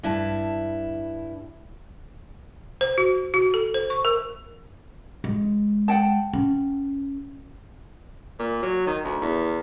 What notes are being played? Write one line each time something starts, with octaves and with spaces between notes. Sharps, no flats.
G2 E4 A5
C5
F#4
F#4
A4
C5
C#6
A#4
G#3
F#5 G5 A5
C#4
A#2
F#3
D#3
D2
E2